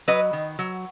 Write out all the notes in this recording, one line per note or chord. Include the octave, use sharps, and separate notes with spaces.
F#3 B4 D#5
D#3
F#3